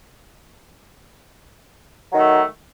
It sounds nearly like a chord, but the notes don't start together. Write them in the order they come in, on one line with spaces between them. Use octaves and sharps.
F#3 D#3 A3